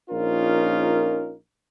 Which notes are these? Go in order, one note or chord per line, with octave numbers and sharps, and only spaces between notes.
A#1 C#4 D#4 F4 A#4